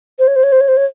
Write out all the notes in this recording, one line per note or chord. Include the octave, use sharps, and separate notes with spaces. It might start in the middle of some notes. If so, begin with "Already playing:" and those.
C5
C#5
C5
C#5
C5
C#5
C5
C#5